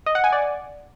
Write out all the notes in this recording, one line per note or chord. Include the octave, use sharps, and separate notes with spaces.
D#5
F#5
G#5
D5